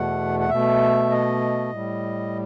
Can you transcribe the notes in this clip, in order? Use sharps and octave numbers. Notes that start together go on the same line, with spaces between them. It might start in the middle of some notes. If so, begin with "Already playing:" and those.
Already playing: E2 B2 A3 F#5
F#5
B2 A3 E5
D#5
A2 G3